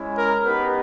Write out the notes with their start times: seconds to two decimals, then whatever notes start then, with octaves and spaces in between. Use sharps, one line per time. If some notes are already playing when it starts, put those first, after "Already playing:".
Already playing: G#3 C#4 E4
0.17 A#4
0.46 B3 D#4 G4 B4